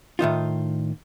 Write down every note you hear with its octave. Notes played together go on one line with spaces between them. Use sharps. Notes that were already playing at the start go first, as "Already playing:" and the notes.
A2 D#3 D#4 F4